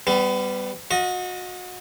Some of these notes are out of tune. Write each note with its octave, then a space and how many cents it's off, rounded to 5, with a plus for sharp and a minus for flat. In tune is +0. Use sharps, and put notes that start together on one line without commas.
G3 +0 B3 +30
F#4 -30 D#5 +20